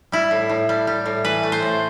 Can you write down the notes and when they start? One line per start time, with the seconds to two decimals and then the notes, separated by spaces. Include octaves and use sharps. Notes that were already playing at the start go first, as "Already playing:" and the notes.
0.12 G3 E4
0.31 A2
0.49 A2
0.69 G3
0.87 G3
1.06 A2
1.25 E3 B4
1.43 A3
1.52 C5
1.62 A2